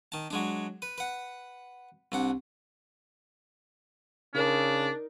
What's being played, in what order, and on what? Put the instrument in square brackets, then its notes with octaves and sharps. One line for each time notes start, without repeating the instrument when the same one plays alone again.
[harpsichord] D#3 A5
F#3 G#3 D4
B4
B4 F#5
C2 D4 F#5
[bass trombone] C#3 [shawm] D4 [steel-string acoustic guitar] D#4 A#4 D5